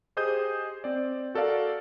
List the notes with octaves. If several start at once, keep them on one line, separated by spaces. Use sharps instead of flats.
G4 G#4 C5 D#5 D#6 G6
C4 D5
F#4 A4 A#4 D5 F5